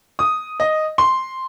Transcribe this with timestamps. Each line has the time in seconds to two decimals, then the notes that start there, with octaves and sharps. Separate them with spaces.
0.19 D#6
0.60 D#5
0.98 C6